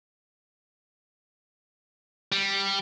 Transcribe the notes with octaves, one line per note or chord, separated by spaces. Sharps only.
G3